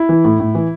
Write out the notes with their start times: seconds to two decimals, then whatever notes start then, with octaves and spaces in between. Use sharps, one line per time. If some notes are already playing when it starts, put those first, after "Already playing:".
Already playing: E4
0.09 E3
0.24 A2
0.40 A2
0.55 E3